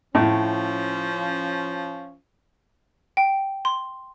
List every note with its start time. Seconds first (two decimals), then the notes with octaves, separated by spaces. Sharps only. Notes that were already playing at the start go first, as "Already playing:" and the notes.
0.15 A2 F3 C#4
3.17 G5
3.65 C6